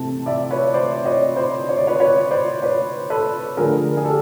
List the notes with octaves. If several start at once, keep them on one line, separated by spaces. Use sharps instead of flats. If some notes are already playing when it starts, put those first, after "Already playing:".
Already playing: C3 E3 A3 C4 A5
D5 E5
B4 C#5
C5 D5
C#5 D#5
C5 D5
C#5
D5
B4 C#5
B4 C#5
C5 D5
B4 C#5
A4 B4
D3 F3 A3 G#4 A#4
G#4
G4 A4